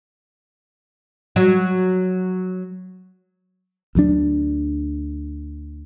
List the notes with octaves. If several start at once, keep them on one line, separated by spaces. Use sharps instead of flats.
F#3
D2 F#3 D4